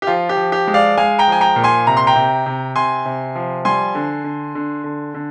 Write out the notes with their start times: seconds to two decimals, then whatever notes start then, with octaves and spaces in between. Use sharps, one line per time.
0.02 G4
0.07 F3 F4
0.29 G4
0.37 F3
0.52 G4
0.67 G#3
0.74 D5 F5
0.97 G#3 F5 G#5
1.19 G5 A#5
1.27 F3 G#5
1.41 G5 A#5
1.56 A#2
1.64 G#5 C6
1.87 C3 A#5
1.97 C6
2.07 G5 A#5
2.16 C3
2.46 C3
2.76 C3 G#5 C6
3.05 C3
3.35 F3
3.65 G3 G#5 C6
3.95 D3
4.24 D3
4.55 D3
4.84 D3
5.14 D3